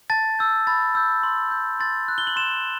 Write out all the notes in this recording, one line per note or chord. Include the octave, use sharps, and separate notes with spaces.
A5 A6
E6 G6
B5 A6
E6 G6
C6
G6
C6 A6
F#6
G7
F#7
C6 E7